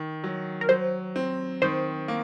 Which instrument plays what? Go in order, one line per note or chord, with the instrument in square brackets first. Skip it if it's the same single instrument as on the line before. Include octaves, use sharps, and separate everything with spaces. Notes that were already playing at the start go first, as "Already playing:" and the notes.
Already playing: [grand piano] D#3
F#3
[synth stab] A#4
[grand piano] F#3 [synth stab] C5
[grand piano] C4
[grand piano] D#3 [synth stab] C5
[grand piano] A#3